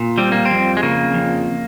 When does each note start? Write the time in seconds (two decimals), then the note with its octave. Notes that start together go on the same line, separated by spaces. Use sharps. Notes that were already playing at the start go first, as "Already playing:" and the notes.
Already playing: A#2
0.18 G3 C4
0.32 A#3
0.45 F2 C4
0.77 G#3
0.83 C#3 A#3
1.14 F2